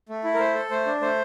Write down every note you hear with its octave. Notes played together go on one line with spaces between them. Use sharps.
A3
E4
A#4
A3 C5
A4
A3 C5
D4
A3 C5